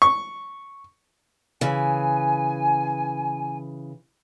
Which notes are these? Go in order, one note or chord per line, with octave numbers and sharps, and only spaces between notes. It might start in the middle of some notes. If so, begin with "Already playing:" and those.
C#6
C#3 E3 G#5